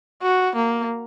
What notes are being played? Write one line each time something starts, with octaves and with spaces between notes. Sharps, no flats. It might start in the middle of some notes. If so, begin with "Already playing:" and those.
F#4
A#3